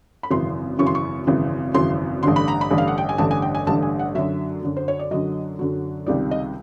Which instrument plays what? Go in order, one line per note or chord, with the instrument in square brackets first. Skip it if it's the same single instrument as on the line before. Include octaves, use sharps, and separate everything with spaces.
[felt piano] B5
G#1 F#2 C#3 E3 C6
G#1 F#2 C#3 E3 C#6
C6
C#6
G#1 F#2 C#3 E3
G#1 F#2 C#3 E3 C6
A1 G2 D3 C6
B5
A#5
B5
A1 G2 D3
F5
F#5
G5
G#5
A1 G2 D3 A5
G#5
G5
G#5
A1 G2 D3 A5
G#5
F#5
F#2 D3 F#3 E5
F#2 D3 F#3
C5
C#5
D5
F#2 D3 F#3 D#5
F#2 D3 F#3
C#2 C3 D#3 G3 D5
D#5